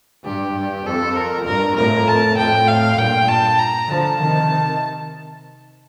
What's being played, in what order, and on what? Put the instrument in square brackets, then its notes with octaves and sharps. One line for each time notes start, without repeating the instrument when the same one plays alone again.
[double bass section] G2 [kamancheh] G4
[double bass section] G2
[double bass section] F2 [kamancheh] A4
[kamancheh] A#4
[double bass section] G2 [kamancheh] A#4
[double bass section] F2 A2 [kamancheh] A#4
[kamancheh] A5
[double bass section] F2 A2 [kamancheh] G5
[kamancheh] F5
[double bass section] G2 A#2 [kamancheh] G5
[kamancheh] A5
A#5
[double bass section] D3 F3 [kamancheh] A5
[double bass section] C3 D#3